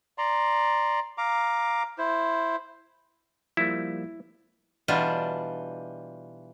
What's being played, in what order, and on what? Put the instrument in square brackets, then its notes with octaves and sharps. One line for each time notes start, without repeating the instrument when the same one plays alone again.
[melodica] D5 A#5 C6
F5 A#5 D6
E4 C5
[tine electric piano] F3 G3 A#3 [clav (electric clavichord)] E4
[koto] B2 E3 G3 D4 F4